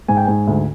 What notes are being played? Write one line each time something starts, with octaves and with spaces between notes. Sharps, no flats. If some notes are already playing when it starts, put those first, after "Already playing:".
G#2 G#5
G5
G#2 G#5
D2